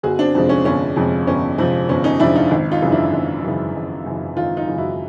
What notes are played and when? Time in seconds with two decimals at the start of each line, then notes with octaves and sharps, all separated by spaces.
0.03 G1 F#4 G#4
0.19 C4 D4
0.35 F2 C3 F3 G#3 C4
0.49 C#4
0.65 G1 C#4
0.96 F2 C3 F3 G#3
1.27 G1 C#4
1.58 F2 C3 F3 G#3 C4
1.89 G1 C#4
2.04 C#4 D#4
2.20 F2 C3 F3 G#3 D4 E4
2.36 D#4 F4
2.51 G#1
2.71 D#4 F4
2.82 F#2 C#3 E3
2.92 D4 E4
3.13 G#1
3.44 F#2 C#3 E3
3.75 G#1
4.06 F#2 C#3 E3
4.37 G#1 D#4 F4
4.57 D#4 F4
4.68 F#2 C#3 E3
4.78 E4 F#4